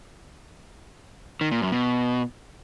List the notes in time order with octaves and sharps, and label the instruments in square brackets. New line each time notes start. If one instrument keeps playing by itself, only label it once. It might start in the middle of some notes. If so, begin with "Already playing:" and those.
[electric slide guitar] D#3
A#2
F#2
B2